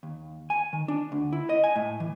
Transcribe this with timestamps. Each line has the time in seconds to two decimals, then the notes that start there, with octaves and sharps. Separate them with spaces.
0.03 D#2
0.50 G#5
0.73 D#3
0.88 D4
1.12 D2
1.33 E4
1.49 D#5
1.64 G#5
1.76 A2
2.00 E3